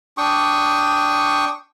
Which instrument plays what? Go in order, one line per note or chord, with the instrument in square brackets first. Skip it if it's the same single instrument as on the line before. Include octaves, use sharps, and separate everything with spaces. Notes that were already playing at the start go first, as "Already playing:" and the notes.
[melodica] D4 G5 C#6 D#6